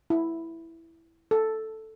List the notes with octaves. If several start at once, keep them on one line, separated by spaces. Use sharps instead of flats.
E4
A4